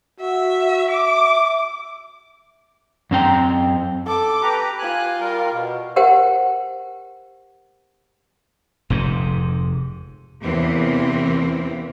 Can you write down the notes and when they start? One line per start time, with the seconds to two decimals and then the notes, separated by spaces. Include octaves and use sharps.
0.20 F#4 E5
0.90 E5 D6
3.11 F#2 C4 G5 A#5
4.06 A4 D6
4.42 G4 B4 A#5
4.78 F4 G4 G#5 F#6
5.19 G3 A#4
5.52 B2
5.96 G4 A#4 C5 F#5 G5
8.90 F1 G#2 C3
10.42 E2 C3 E3 A#3 C4 C#4